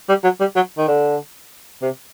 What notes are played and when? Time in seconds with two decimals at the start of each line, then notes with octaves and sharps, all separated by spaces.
0.09 G3
0.24 F#3
0.40 G3
0.56 F#3
0.78 D#3
0.88 D3
1.82 C3